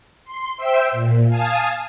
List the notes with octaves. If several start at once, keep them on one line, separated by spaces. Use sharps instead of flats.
C6
C5 E5 G5 E6
A#2
F5 G#5 A5 D#6